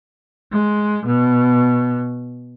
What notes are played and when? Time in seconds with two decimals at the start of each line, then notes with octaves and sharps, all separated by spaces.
0.52 G#3
1.05 B2